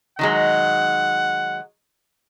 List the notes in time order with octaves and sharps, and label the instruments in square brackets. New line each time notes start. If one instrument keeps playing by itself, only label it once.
[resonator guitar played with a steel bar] D#3 F#3 G#3 [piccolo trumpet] F#5